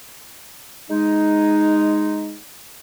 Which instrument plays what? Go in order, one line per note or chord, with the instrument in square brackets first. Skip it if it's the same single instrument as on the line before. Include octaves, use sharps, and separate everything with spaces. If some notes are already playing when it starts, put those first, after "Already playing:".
[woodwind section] G#3 D#4